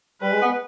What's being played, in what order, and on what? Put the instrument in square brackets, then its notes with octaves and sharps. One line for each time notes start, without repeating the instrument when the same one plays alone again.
[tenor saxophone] G3 [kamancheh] B4
[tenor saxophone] G#3
B3